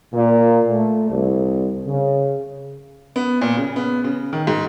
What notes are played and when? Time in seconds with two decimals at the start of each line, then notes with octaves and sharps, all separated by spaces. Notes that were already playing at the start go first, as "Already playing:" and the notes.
0.13 A#2
0.70 A3
1.10 C2
1.87 C#3
3.16 B3
3.41 A#2
3.57 C#3
3.76 B3
4.04 C#3
4.33 D#3
4.47 G#2